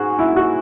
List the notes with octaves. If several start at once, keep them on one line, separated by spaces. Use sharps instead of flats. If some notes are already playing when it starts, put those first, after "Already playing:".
Already playing: G#2 F#4 G#4
E4
F#4